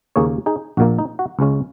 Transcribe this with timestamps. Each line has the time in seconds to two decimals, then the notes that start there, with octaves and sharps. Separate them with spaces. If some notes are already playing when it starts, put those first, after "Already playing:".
0.16 D#2 C#3 A#3 G#4 C#5
0.46 D#4 G#4
0.77 A#1 A#2 A#3 F#4
0.99 D#4
1.19 F#4
1.39 C#2 C#3 G#3 C#4